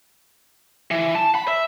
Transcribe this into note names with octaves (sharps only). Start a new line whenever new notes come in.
E3
A5
B5
E5